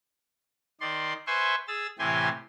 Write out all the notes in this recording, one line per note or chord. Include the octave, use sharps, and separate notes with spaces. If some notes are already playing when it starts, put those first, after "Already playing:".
D#3 D5 C6
B4 C5 E5 G#5 C6 C#6
G#4 E6 A6
A2 C3 E3 G4 G#5 C6